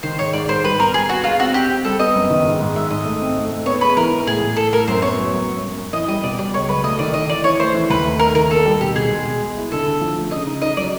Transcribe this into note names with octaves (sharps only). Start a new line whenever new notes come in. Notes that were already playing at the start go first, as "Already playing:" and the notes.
D#3 C5
G#2 C#5
G#2 D5
G#2 C5
G3 B4
B3 A#4
G3 G#4
B3 F#4
G#3 F4
C4 F#4
C4 G4
C4
G3 A4
B3 D#5
F#2
D#3
G#2
G#2
G#3 E5
G#2 D#5
A3
C4
A3
A3
B3 C#5
G#3 B4
E3 A#4
E3
A2 G#4
A2
A2 A4
A2 A#4
F#2 C5
B3 C#5
F#3
F#2
F#2
F#2
F#2
E3 D#5
G3 D#5
B2 D5
G3 D5
C#2 C#5
F#3 B4
A3 D#5
D#3 D5
D#3 D#5
E3 D5
E3 C#5
A3 C5
E3
D#2 B4
A3
A3 A#4
D#3 A#4
A#3 A4
G3
B2 G4
B2 G#4
G#3
B2
G#3
E4
D3 A4
D3
F3
A3
C#3 D#5
D#4
D#4 D#5
F#3 D5